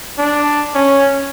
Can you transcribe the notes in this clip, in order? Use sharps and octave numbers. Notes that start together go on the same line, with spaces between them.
D4
C#4